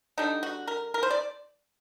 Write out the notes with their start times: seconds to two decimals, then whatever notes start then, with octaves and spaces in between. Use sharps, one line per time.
0.18 D3 G3 D4 D#4
0.43 F#4
0.68 A#4
0.94 A#4
1.03 C5
1.10 D5